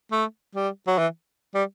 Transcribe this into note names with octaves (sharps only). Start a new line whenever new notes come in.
A3
G3
F#3
E3
G3